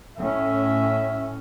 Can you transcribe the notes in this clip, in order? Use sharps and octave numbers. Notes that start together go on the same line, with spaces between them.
A2 C#4 E5